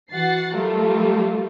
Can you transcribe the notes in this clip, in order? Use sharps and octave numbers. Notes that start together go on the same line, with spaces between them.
E3 F#4 F#5 A6 C7
F#3 G3 A3 F4 A4 A#4